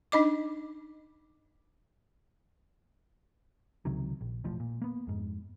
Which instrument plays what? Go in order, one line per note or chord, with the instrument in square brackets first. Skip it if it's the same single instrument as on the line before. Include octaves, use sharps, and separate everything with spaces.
[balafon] D4 D#4 D#5 D6
[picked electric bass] C#2 C3 D#3 F#3
A#1
E1 A1 A2 F3
A#2
A#3 B3
F2 G#2